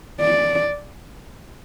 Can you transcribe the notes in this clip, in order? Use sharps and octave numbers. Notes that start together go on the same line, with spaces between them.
D5